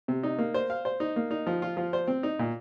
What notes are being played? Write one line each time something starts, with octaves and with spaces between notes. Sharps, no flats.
C3
D#4
A#3
C5
F5
C5
D#4
A#3
D#4
F3
F4
F3
C5
C4
D#4
A#2